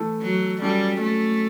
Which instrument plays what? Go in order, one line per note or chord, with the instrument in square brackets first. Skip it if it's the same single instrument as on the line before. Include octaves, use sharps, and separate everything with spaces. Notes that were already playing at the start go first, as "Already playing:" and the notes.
Already playing: [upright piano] E3 A3 E4 A4
[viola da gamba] F#3
[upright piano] F#3 C#4 E4 A4 [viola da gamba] G3
[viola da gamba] A3